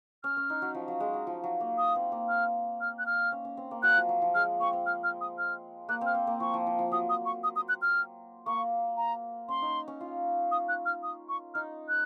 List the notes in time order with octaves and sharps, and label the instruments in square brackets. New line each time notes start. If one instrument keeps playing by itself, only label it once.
[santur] C#4 [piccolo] F6
[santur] C#4
D#4
F#3
F3
F#3
G#3
F#3
F3
F#3
A#3
[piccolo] D#6
[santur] C4
A#3
[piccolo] F6
F6
F#6
F6
[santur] C#4
C#4
C4
A#3
[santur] F#3 [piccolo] F#6
[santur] F3
F#3
F3
[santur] G#3 [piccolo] F6
[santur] C4 [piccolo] C#6
[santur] C4
[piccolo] F6
F6
D#6
F6
[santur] A#3 [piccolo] F#6
[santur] C4
[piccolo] F6
[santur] C4
A#3
[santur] F3 [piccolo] C#6
[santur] F3
F3
F3
[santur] F#3 [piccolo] D#6
[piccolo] D#6
C#6
D#6
D#6
F#6
F6
[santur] A#3 [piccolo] C#6
[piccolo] A#5
[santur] C#4 [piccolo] C6
[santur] D#4
C#4
F4
[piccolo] D#6
F#6
F6
D#6
C#6
[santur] D#4 [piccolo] F6
[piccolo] F#6